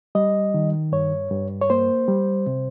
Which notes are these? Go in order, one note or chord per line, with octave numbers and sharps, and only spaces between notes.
G3 D#5
D#3
G2 C#5
G2
C#5
A#3 C5
G3
C3